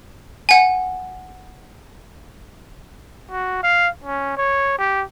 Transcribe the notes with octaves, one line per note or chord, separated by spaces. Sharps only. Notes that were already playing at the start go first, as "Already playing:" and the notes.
F#5 G#5
F#4
F5
C#4
C#5
G4